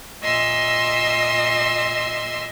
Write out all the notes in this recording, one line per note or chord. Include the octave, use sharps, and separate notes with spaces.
A#2 D#5 E5 C6 E6